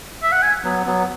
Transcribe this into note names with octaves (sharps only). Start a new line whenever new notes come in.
E5
F#5
G#5
F#3 B3
F#3 B3